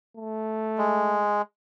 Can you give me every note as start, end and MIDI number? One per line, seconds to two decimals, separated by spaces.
0.17 1.26 57
0.78 1.42 56